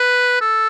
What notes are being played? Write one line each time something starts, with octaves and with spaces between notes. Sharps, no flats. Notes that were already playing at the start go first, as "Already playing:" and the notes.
Already playing: B4
A4